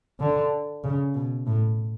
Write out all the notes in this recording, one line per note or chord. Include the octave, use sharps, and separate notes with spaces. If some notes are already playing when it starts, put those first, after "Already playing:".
D3
C#3
B2
A2